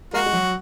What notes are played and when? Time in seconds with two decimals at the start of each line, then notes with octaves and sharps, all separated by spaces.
0.14 G#3 A#3 F#4
0.26 G#3
0.33 F#3